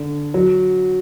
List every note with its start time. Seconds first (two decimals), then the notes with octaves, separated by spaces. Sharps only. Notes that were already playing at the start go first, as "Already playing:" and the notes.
Already playing: D3
0.34 F#3